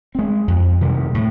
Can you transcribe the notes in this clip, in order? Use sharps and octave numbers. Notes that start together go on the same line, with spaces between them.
G#3 C4
F2
C3 D#3 G3
A2